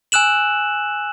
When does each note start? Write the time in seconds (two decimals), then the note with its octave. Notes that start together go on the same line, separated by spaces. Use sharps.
0.12 G#5 E6 F#6 E7 F#7